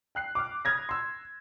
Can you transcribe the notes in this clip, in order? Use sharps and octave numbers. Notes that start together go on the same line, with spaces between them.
G5 F#6 C7
D6 F6
B5 D#6 F6 G#6 A#6
C6 E6